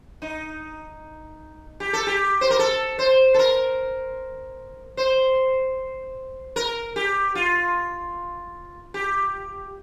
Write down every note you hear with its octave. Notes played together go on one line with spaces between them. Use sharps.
D#4
G4
A4
G4
C5
A#4
A4
C5
A4
A#4
C5
A#4
G4
F4
G4